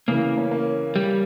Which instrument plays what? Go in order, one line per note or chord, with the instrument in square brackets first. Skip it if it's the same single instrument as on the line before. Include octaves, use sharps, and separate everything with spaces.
[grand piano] C#3 E3 [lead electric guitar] A#3
[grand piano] A#3 C#4
A#3 C#4
[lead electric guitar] G3